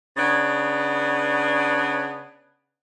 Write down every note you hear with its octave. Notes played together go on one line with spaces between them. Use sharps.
C#3 B3 D4